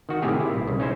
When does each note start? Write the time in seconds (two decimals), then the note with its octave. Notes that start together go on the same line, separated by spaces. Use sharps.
0.09 D#3 F#4
0.22 A2 C3 D#3 A#3 G4 G#4
0.40 E4
0.54 B1
0.68 C2 C#3
0.80 C#4 D#4 E4 C5